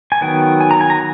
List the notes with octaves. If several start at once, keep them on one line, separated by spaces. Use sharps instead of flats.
G#5
D#3 F#3 B3 G5
G#5
A#5
G#5
A#5